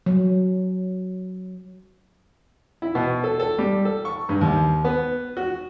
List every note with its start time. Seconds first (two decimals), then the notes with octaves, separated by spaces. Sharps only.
0.06 F#3
2.82 E4
2.95 B2
3.24 A4
3.40 A4
3.59 G3
3.85 A4
4.05 C#6
4.29 G2
4.41 D#2
4.85 B3
5.37 F#4